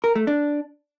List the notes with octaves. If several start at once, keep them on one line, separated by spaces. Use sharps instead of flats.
A#4
A3
D4